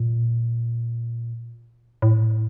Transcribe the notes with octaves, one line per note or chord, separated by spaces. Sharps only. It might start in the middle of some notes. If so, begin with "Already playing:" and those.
Already playing: A#2
A2